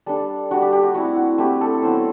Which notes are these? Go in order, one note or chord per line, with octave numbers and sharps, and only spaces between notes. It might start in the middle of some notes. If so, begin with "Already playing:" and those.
G3 D4 A4
G3 D4 F#4
G4
G4
F#4
A3 C4 E4 F#4
F#4
A3 C4 E4 G4
A4
F#3 B3 E4 C5